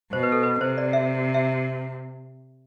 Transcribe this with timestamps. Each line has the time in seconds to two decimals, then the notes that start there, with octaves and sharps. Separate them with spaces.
0.12 B2 C5
0.23 B4
0.32 A4
0.43 B4
0.61 C3 C5
0.78 D5
0.93 E5
1.34 E5